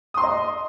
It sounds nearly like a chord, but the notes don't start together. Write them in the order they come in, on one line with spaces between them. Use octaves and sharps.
D#6 C6 A#5 D#5